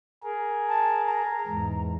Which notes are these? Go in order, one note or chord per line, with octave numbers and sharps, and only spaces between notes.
G#4 A#4
A5
A#5
E2 G#2